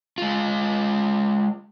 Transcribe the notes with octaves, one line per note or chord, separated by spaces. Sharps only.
G#3 F4